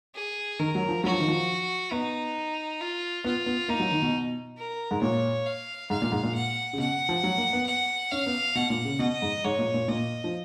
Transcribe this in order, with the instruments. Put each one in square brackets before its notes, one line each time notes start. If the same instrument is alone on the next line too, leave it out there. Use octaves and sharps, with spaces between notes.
[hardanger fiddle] G#4
[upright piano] D#3 [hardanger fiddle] A#4
[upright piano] F#3
F3
[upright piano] F#3 [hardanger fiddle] F#4
[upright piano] F3
D#3
F3
[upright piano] B3 [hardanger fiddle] D#4
[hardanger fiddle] F4
[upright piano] B3 [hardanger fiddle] F4
[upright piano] B3
[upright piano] A#3 [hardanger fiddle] D#4
[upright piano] F#3
D#3
B2
[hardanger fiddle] A#4
[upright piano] G#2
[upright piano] A#2 [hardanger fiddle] C#5
[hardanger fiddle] F5
[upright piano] G#2 [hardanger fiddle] F5
[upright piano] A#2
G#2
A#2
[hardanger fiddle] F#5
[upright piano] C#3
[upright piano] B2 [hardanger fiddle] F#5
[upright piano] F3
F#3
A#3
B3
[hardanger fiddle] F#5
[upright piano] C#4 [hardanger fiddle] F5
[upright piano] B3
[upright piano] B2 [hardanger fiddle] F#5
[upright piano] A#2
C#3
[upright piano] B2 [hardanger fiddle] D#5
[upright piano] G#2
[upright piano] G#2 [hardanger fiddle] C#5
[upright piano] A#2
A#2
[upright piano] A#2 [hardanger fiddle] D#5
[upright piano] F3